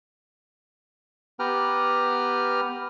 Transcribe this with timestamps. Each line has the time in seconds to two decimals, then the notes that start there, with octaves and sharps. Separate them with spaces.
1.40 B3 G4 B4 G5 A#5 F6